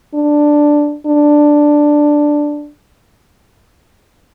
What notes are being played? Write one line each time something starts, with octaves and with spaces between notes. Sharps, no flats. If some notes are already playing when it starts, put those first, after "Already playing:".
D4
D4